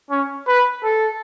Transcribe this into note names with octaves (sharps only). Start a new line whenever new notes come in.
C#4
B4
A4